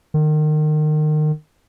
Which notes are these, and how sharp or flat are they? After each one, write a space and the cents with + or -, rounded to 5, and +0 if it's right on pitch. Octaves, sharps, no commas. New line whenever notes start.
D#3 -30